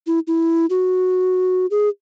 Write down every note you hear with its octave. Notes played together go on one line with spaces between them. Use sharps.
E4
E4
F#4
G#4